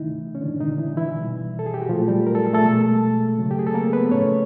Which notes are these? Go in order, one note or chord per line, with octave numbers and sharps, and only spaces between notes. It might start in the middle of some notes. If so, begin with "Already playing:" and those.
Already playing: C3 D#3 E3 A3 D#4 E4
C#4
A#2 D3 F3 G#3 D4
D#3 D#4
E3 E4
E3 E4
B2 G3
A4
G#4
G4
F#4
A#2 F3 F#3 A3 F4
G3 G4
A#4
A4
G#4
A3 A4
B2 G#3
C#3 F#3 A3
G4
G#4
A4
A#3 A#4
B3 B4
A2 F3 A3 C#4 C#5